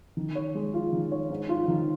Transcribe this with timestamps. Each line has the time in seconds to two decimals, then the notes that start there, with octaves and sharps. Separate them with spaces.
0.17 D#3
0.35 C#5
0.55 G#3
0.74 F4
0.93 D#3
1.12 C#5
1.30 G#2
1.49 F4
1.68 D#3